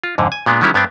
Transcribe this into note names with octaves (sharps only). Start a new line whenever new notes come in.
F4
F2 G#2 D3
G#5
A#2 G#3 B3 D4
D#3 F#3 G3 C#4 E4 A#4
G2 B3 C4 D4